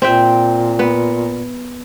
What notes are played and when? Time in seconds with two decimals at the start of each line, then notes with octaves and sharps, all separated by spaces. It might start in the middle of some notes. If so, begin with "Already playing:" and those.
0.02 A#2 C4 E5 G5
0.79 B3